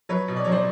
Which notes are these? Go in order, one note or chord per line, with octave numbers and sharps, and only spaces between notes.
F#3 B4 C#5
B2
D5
F#3 C#5
C5 D5